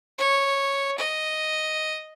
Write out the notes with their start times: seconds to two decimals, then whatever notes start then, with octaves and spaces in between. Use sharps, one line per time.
0.19 C#5
0.98 D#5